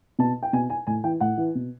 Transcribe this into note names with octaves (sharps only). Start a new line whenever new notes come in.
B2 A5
G5
B2 G#5
G#5
A2 G#5
E3 G5
A2 F#5
E3
B2